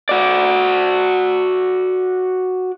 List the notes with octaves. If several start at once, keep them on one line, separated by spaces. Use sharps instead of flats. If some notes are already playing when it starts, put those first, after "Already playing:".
F#4 D5